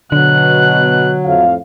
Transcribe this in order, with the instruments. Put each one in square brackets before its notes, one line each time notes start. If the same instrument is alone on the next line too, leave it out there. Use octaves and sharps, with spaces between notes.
[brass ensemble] B2 [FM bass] D3 [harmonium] F#3 [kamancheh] F#6
[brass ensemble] F2 A2 F5